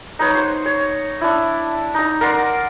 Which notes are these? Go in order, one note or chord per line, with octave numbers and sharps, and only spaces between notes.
D#4 B4 C#5
C5 C6
C#5
D4 E4
D#4 A#5
A#4 D5 F#5 C6